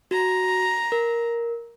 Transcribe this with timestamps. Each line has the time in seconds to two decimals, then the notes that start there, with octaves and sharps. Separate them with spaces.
0.11 F#4 A#5
0.92 A#4